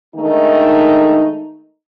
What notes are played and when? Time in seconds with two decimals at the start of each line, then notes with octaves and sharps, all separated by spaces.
0.15 D#3 G#3 A3 D4 D#4